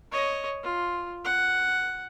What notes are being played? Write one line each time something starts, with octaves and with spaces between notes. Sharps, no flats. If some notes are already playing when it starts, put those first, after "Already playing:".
C#5 D#5
F4
F#5